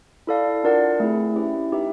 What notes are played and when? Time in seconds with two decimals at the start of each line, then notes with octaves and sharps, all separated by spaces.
0.27 E4 A4 D5 F5 A5
0.64 D4 F4 A#4 D5 F#5
1.00 A3 C4 E4 G#4
1.36 C#4 E4 G4 B4 E5
1.72 D#4 G4 B4 E5